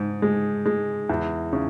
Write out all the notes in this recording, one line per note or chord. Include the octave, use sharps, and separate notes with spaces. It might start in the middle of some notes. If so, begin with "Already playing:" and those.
Already playing: G#2
G#3
G#3
E2
C#3